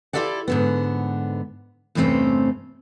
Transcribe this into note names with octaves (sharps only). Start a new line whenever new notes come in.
E4 F4 G4 A4 D5 F#5
G#2 D3 B3
E2 G2 C3 A3 C4 C#4